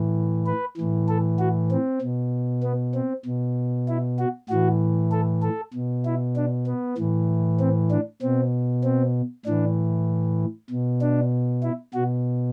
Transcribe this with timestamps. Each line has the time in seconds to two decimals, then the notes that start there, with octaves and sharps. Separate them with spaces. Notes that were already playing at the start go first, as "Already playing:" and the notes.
Already playing: A2 E3
0.47 B4
0.77 A2 E3
1.09 A4
1.39 F#4
1.71 C4
2.02 B2
2.63 B3
2.95 C4
3.25 B2
3.88 E4
4.19 F#4
4.50 A2 E3 F#4
5.12 A4
5.43 A4
5.74 B2
6.05 E4
6.36 D4
6.67 B3
6.98 A2 E3
7.60 C4
7.91 D4
8.22 B2 C4
8.84 C4
9.46 A2 E3 D4
10.70 B2
11.01 D4
11.63 E4
11.94 B2 F#4